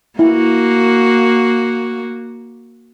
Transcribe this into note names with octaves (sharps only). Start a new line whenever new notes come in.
A#3 E4 F#4